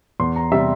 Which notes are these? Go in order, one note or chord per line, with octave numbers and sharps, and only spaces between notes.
E2 C6
A#5
C3 G3 E5